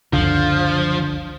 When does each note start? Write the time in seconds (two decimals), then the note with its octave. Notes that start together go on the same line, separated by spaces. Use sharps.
0.13 F#1 C#2 D3 F3